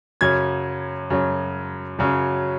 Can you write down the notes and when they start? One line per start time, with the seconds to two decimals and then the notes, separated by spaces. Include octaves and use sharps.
0.21 F#2 C#3 F#3 C#4 G#6
1.10 F#2 C#3 F#3 C#4
1.99 F#2 C#3 F#3 C#4